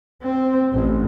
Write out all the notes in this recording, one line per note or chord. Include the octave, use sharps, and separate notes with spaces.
C4
A1